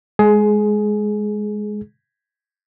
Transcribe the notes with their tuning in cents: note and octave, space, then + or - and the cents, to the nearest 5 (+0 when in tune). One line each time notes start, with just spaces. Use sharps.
G#3 +0 G#4 +20